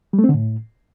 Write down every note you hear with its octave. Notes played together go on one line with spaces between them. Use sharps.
G3
A3
C4
D3
A2